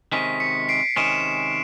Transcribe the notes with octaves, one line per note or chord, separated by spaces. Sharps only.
C3 D#3 G#3 C#4 B6
B6 C#7
C7 D7
C3 D#3 G#3 C#4 D7 E7